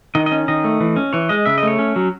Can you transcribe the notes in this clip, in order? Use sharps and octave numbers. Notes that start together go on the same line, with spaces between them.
D#3 D#5
D#5
C#4
D#3 D#5
A3
E3
C#4
E3 C#5
G#3 D#5
C#3 E5
D#5
A3 C#5
C#4
F#3